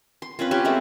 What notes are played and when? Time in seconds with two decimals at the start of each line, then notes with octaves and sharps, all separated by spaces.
0.22 C6
0.39 C4 C#4 F4 B4
0.51 B3 C#4 G4
0.65 G#3 A3 C4